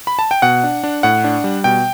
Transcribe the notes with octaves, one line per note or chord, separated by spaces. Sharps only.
B5
A5
G5
B2 F#5
D4
D4
A2 F#5
D4
G3
B2 G5